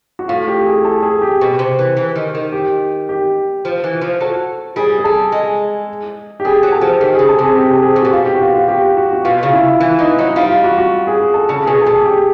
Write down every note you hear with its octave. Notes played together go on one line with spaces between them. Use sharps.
F#4
A2 F4
G4
G#4
A4
G#4
G4
B2
C3
E3
E3
D#3
D#3
G4
G4
F3
E3
F3
F#3 A4
G3 G#4
G#4
G3 A4
G#3
G4
G3 G#4
F#3
A4
F3
D#3 G4
G#4
C#3
A4
C3 G#4
G4
A4
G#4
A2 G4
A#2 F#4
B2 F4
G4
F#4
F4
F4
G4
F#4
F#4
B2 F4
C#3 F4
E4
E3 E4
E3 D#4
F#3 D#4
G3 F4
F4
F#4
F#4
G#4
G#4
A4
C#3 A4
B2 G#4
A4
A#2 G#4
G4